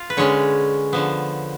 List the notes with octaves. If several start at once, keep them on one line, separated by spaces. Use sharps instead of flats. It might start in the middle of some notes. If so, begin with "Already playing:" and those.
Already playing: F4
B4
D3 G#3 C#4 C#5
D3 F3 B3